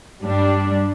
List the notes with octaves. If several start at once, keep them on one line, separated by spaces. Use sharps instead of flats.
G2 G3 D4